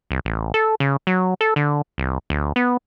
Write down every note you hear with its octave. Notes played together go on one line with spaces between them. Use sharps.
C2
A1
A4
C#3
F#3
A4
D3
C2
D2
B3